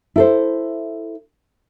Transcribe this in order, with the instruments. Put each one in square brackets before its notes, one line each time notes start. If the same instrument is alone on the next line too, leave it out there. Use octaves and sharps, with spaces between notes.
[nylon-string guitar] E4 A4 C5